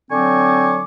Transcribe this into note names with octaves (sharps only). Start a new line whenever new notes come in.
D3 F#3 C4 G#5 C#6 D6